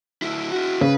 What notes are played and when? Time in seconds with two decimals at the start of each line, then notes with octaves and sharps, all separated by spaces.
0.22 D2 E4
0.51 E4 F#4
0.81 C#3 B4